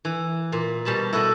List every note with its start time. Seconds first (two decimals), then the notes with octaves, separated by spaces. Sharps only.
0.05 E3
0.52 A#2
0.85 B2 G3 A5 B5
1.13 E4 F#4 A4 D#5